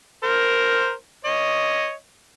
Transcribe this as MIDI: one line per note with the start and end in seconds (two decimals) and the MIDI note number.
0.23 0.93 70
0.23 0.93 72
1.25 1.93 73
1.25 1.93 75